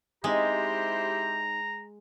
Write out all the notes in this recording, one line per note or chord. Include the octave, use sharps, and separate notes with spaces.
G#3 C4 D#4 E4 G4 C5 D#5 A#5